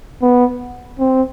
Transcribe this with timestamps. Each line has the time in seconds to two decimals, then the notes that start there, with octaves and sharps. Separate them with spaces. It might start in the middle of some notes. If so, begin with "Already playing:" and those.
0.22 B3
0.99 C4